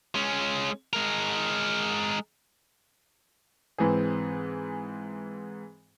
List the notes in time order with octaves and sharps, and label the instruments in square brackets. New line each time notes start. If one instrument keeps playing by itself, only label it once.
[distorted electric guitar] G#3 C#4
G#3 A#4
[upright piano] G#2 E3 C4 G#4